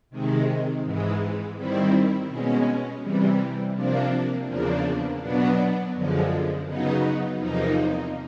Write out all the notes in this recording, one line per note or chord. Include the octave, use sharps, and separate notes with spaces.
C3 D#3 G#3
G#2 E3 G#3
D#3 G3 C4 E4
B2 G#3 C#4
C3 E3 G3
C3 F3 A#3 D4
E2 C#3 F3 A#3 D4
B2 F#3 B3 D4
F#2 D3 F3 G#3
C#3 F#3 B3 D#4
E2 C3 F3 A#3 D#4